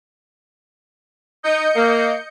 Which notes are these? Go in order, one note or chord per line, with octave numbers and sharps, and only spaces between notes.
D#4 D#5 G6 C#7
A#3